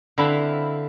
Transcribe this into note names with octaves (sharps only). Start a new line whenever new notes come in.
D3 C4 E4 B4 F5